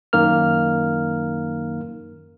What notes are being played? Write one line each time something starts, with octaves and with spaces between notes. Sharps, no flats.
F#2 D#3 A#3 A#4 F6